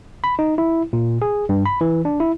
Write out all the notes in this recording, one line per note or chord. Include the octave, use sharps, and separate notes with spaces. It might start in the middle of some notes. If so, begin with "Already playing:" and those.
B5
D#4
E4
A#2
G#4
G2
B5
E3
D4
E4